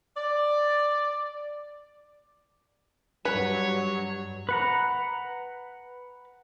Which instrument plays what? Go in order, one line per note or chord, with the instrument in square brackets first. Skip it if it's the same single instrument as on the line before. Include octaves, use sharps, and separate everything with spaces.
[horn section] D5
[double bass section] G2 [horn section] F#3 [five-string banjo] B4 [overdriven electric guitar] C#5
[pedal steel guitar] B4 F#5 A#5